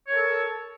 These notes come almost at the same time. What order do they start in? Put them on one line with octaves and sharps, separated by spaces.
C#5 A#4 A5 A4